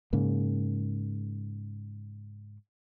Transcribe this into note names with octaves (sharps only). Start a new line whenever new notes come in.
G#2 C#3 A#3